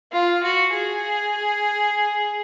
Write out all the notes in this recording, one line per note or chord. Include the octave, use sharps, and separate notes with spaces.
F4
F#4
G#4